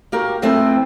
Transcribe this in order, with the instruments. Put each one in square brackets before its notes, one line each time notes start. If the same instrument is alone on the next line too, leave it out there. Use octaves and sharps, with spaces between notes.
[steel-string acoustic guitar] A#3 F#4 G4 A#4
F2 F3 A3 B3 C4 E4